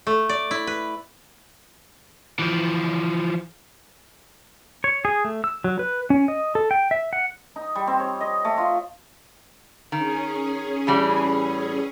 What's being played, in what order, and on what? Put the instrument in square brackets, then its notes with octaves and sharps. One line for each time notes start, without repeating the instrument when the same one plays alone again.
[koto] A3
D5
E4
B4
[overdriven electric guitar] E3 F3
[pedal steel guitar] C#5
G#4
A3
E6
F#3
B4
C#4
D#5
A4
G5
E5
F#5
[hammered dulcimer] D#4
G3
C4
C#5
D#5
A3
F4
[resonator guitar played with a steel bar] D#3 [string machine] C#4 G#4
[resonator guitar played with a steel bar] A2 E3 G3